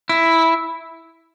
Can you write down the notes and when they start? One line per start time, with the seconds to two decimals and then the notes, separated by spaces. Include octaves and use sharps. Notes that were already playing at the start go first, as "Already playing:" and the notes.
0.09 E4